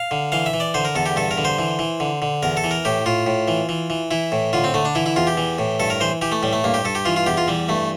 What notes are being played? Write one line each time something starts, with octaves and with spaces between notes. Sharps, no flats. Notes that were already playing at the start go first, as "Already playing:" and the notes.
Already playing: F5
D3
E3 F5
E5
E3
D5
D3 C5
A#4
E2 A4
G4
G2 A4
A#4
D3
C5
E3
E3
D3
D3
E2 A#4
A4
E3
A#4
A2 G4
A2 F4
A2
E3
E3
E3
E3 E4
A2
D3 F4
C4
D3 A3
D4
E3 E4
E4
E2 F4
G4
E3
A2
G2 A4
A#4
E3 C5
E3 G4
A3
A2 G3
A3
G2 A#3
G4
G2 A4
G4
E3 F4
F4
E2 G4
F4
E3 G3
G2 A3